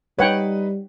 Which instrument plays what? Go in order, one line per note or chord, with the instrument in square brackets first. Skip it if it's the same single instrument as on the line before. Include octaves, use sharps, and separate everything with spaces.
[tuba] G3 [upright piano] D#4 B4 [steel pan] C#5 F#5 G5